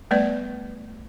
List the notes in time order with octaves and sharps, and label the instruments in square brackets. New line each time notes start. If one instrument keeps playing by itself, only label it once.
[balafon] G3 A3 B3 B4 D5